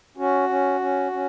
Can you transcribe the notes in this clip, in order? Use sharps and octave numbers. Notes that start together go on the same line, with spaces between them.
C#4 F#4
C#4
C#4
C#4